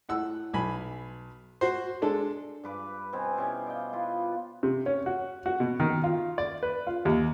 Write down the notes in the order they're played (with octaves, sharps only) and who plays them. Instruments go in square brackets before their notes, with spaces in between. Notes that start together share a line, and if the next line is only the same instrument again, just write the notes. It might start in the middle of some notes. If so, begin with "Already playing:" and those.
[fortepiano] A2 F#5 E6
B1 G#5 B5
F#4 C5
G#3 D4 A4
[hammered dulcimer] G2 B4 D6
B2 C4 G#5
B2 C#4 E4 G4
D5 D#5 F5 G5
E4 F4 B4
[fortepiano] C3
C#4
F#4
F#4
B2
D#3
F4
D5
B4
F4
D#2